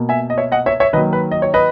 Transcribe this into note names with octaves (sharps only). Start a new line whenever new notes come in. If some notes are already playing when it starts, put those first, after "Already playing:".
Already playing: B2 A#3
E5 G#5
D#5
C#5 E5
D#5 F#5
C#5 E5
C#5 E5
D#3 F#3 A#3 B4 D#5
B4
D#5
C#5
B4 D#5